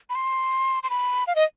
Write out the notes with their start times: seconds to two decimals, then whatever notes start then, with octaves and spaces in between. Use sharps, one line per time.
0.10 B5
0.15 C6
0.83 C6
0.90 B5
1.27 F5
1.35 D#5